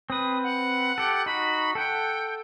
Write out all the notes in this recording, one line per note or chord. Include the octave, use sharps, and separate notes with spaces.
C4 B4 D#6
F#5
G4 A4
D#4 F#4 B5
A4 F#5 G5